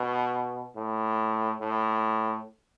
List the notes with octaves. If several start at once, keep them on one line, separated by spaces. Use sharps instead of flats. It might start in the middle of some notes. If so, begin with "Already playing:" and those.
Already playing: B2
A2
A2